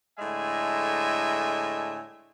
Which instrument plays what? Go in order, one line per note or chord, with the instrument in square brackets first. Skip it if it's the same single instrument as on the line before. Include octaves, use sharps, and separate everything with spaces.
[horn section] A2 D3 G#3 E5 G#5